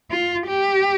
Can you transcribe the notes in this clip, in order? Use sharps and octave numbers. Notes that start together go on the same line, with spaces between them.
F4
G4